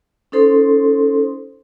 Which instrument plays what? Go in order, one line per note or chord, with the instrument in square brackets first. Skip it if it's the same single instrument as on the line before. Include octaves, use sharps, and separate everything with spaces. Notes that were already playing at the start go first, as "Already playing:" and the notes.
[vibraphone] C#4 D#4 A4 C5 C6